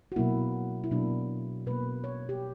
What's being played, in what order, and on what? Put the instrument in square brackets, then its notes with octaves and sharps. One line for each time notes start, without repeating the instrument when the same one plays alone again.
[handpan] F#4
B2 F#3 A#3 E4
E4
B2 F#3 A#3 D4
B2 A#3 B4
C#5
G4